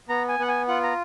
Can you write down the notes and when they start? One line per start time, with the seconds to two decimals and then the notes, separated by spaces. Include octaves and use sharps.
0.09 B3 A#5
0.29 G#5
0.39 B3 F#5
0.48 G#5
0.68 F4 F#5
0.83 A#5